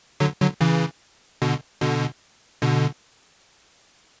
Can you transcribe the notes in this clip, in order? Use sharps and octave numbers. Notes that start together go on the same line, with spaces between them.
D3 F#3
D3 F#3
C#3 E3
B2 D3
B2 D3
B2 D3